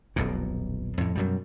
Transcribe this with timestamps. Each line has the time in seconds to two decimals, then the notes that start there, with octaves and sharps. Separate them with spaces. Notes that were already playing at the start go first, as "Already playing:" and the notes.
0.16 D#1 B1 F2 A#2
0.98 F2 A2
1.15 F#2 B2 G3